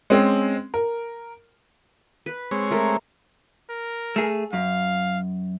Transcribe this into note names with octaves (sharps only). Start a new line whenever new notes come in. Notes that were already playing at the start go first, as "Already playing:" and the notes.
G#3 C4 C#4
A#4
B4
G#3 C4 C#5
A3 A#4
A#4
A3 G#4
F#2 F5